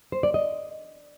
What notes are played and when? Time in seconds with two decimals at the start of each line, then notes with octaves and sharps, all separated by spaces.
0.12 C5
0.23 D5
0.34 D#5